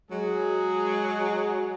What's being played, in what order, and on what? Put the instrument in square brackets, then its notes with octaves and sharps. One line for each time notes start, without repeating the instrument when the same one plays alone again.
[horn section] F#3 G#3 G#4